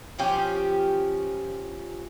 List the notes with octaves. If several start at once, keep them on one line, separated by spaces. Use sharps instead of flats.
F3 C#4 G4